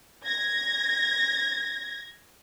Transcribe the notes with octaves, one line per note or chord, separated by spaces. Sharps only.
G#6 A#6